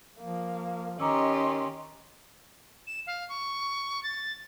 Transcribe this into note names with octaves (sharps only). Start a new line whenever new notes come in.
F3 A#3
D#3 C#4 G4 D#5 A#5 C6 D6 E6
E7
F5
C#6
A6